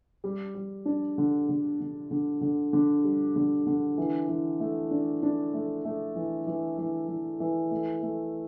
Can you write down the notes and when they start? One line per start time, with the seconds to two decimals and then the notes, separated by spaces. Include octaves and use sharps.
0.24 G3
0.55 G3
0.86 D4
1.18 D3
1.49 D3
1.80 D3
2.11 D3
2.41 D3
2.73 D3
3.04 G3
3.36 D3
3.67 D3
3.98 E3
4.29 E3
4.60 A3
4.91 D4
5.23 D4
5.54 A3
5.85 A3
6.16 E3
6.47 E3
6.78 E3
7.08 E3
7.40 E3
7.71 A3
8.03 A3